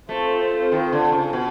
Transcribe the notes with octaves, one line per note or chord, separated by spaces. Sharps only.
A3 C4 F4 A4 C5
D#3
D3
C#3
B2